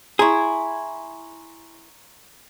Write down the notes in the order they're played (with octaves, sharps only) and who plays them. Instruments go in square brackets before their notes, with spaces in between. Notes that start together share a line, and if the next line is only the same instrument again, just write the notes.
[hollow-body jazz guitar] E4 G#4 [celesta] A#5 C6 C#6